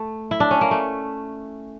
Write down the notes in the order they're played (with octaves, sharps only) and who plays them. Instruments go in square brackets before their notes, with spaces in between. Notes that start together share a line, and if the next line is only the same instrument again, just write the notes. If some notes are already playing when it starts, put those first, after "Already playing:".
Already playing: [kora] A3
E4
D4
C#4
A#3
A3